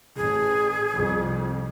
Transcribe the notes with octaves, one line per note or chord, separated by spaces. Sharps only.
A1 G#4
C2 F2